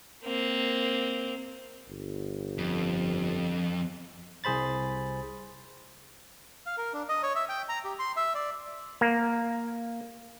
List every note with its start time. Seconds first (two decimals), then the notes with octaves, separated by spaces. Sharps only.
0.24 A#3 C4
1.88 G1
2.58 F2
4.44 C2 G#4 C5 B5 A6
6.66 F5
6.78 A#4
6.93 D4
7.09 D#5
7.23 C#5
7.35 E5
7.49 G5
7.69 A#5
7.85 G4
7.99 C6
8.17 E5
8.34 D5
9.01 A#3